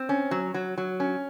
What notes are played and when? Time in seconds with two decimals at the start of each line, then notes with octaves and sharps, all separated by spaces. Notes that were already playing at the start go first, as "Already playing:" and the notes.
Already playing: C4
0.09 C#4
0.31 F#3
0.54 F#3
0.78 F#3
1.00 C#4